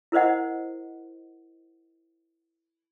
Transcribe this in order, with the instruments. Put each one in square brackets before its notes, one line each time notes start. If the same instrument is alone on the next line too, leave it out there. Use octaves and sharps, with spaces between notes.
[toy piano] E4 A#4 C5 D#5 F#5